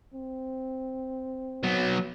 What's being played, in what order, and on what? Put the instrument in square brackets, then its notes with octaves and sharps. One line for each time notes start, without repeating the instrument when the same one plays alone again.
[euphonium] C4
[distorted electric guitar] F#3 B3